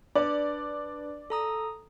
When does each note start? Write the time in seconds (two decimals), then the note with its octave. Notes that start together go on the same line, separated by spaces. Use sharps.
0.15 D4 B4 D5
1.30 A4 A#5 D#6